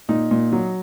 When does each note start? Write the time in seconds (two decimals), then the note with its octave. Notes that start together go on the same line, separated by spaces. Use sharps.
0.09 A#2 D#4
0.31 A#2
0.52 F#3